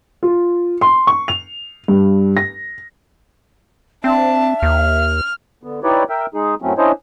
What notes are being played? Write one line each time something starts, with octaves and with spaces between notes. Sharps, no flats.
F4
C6
C#6
F7
G2
A#6
C4 D4 E5 A5
D#2 F6
D3 B3
D#4 E4 G4 B4 C#5 D5
A#4 E5 G5
G#3 D#4 G#4
F#2 A2 F#3 A3 C4 C#4
C#4 D4 E4 C5 C#5 D#5